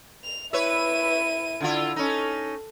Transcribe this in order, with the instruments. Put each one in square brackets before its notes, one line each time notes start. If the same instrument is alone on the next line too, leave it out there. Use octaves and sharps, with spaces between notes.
[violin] F7
[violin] E4 D#7 [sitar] B4 C#5 E5
[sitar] D3 E4 F4
[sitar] C#4 D#4 [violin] A4